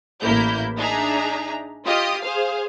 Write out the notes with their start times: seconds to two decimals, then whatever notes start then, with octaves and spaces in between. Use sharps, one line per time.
0.22 A1 A#3 E4 G6
0.76 D4 D#4 G#4 E5 A#5
1.84 F4 G4 D#5 D#6
2.21 G#4 C5 F5